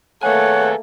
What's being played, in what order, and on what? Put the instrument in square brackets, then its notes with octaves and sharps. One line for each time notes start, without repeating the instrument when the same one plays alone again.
[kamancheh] A3 A#3 [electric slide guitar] G#4 B4 G#5 [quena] C#5 [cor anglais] F#5